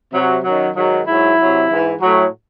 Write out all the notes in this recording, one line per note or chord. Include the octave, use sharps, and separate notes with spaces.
C3 F#3
F#2 D#3 F#3
G#2 D#3 F#3
G#2 F#3 E4
C3 F#3
G#2 E3
A2 F#3